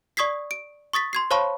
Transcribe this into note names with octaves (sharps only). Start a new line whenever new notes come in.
D5 C#6 D#6 G#6 B6 C7
D7
C#6 D#6 A6 B6
C6 G#6 C7
C5 C#5 F5 A5 B5 C#6